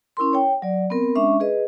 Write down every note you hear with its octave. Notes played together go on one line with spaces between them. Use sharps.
C#4 E4 A#4 C6
C#5 G5
F#3 D5
B3 C4 A#4
G#3 C#4 D4 E5 C#6
G#4 B4 D#5